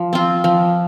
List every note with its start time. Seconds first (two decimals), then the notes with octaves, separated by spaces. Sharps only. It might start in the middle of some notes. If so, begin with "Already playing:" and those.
Already playing: F3
0.13 C4 F4
0.44 F3